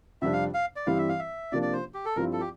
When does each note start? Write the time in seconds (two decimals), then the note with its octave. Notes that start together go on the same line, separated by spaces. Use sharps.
0.22 F2 C3 G3 D4 E5
0.33 F5
0.54 F5
0.76 D5
0.87 G2 E3 G3 C4 E4 F5
0.98 E5
1.09 F5
1.19 E5
1.52 C3 F3 A#3 D4 D5
1.62 D5
1.73 C5
1.94 G4
2.05 A4
2.16 G2 F3 C4 E4 A#4
2.33 A4
2.41 G4